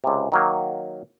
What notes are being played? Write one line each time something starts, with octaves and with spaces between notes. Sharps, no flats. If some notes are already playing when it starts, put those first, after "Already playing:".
C#2 C3
D#3 F#3 A#3